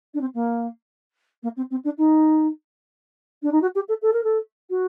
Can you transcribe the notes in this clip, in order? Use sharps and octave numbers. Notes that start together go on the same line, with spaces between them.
D4
C4
A#3
A#3
C4
C4
D4
D#4
D4
D#4
F#4
G4
A4
A4
A#4
A4
F#4